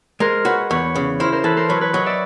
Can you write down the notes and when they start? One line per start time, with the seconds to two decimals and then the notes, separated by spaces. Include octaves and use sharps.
0.20 G#3 A#4 C5
0.45 F#4 B4 C#5
0.70 E2 B4 C#5
0.96 C#3
1.20 E4 A#4 C5
1.32 A#4 C5
1.44 E3 A4 B4
1.57 A#4 C5
1.69 F#3 B4 C#5
1.81 B4 C#5
1.93 F#3 C#5 D#5
2.06 D5 E5